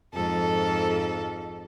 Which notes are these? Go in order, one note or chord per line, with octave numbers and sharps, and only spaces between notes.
F2 G#2 A4